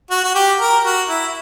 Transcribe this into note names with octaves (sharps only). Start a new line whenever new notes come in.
F#4
F#4
G4
A#4
F#4
E4